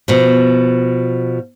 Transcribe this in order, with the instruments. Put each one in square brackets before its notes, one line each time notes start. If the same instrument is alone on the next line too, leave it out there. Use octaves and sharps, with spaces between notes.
[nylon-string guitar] B2 F3